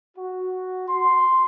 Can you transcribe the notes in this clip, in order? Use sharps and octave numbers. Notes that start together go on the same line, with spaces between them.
F#4
C6